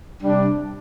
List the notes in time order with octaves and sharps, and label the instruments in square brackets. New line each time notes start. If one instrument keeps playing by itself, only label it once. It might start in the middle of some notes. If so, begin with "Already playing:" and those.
[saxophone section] C3 G3 D4